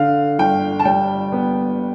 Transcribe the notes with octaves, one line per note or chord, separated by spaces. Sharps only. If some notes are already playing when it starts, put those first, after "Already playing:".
Already playing: D3 F5
G1 G5
A5
G3 G5
B3